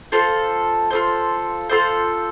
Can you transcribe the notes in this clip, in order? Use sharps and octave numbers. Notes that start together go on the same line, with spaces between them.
F4 A4 C5
F4 A4 C5
F4 A4 C5